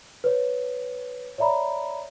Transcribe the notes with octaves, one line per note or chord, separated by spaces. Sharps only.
B4 C#5
C#5 D5 E5 A#5 B5